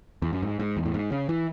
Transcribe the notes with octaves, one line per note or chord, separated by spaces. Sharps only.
E2
F#2
G#2
G#2
E2
A2
G#2
C#3
E3